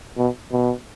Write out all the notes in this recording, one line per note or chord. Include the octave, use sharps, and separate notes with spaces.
B2
B2